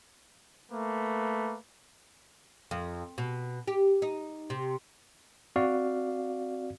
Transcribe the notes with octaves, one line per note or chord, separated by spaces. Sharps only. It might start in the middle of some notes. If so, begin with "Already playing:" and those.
A3 A#3 B4
F2
B2
G4
D#4
C3
C4 F#4 D5 F5